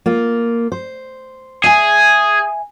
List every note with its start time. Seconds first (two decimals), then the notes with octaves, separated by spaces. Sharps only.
0.06 A#3 F4
0.72 C5
1.64 G#4 E5 G#5